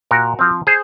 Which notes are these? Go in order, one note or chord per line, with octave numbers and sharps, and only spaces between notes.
A#2 F#4 A#4
F3 C4
G#4 C5